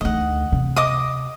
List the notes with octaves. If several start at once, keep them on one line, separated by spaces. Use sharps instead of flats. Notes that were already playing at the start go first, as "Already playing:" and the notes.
D2 D#3 D#5 F#5
C3
D#5 D6 D#6